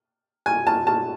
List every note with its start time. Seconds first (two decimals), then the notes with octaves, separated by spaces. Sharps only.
0.46 G#5
0.67 A5
0.87 A5